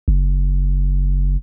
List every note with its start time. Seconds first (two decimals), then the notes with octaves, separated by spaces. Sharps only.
0.08 F#1